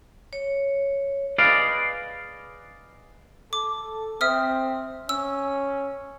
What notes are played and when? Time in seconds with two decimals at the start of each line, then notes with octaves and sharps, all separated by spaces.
0.33 C#5
1.38 G#4 B4 D5 D#5 F5
3.53 A4 D6
4.21 C4 E5 D#6 F6
5.09 C#4 E6